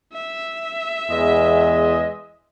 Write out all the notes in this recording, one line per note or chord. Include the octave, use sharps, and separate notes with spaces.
E5
E2 G#3 D#5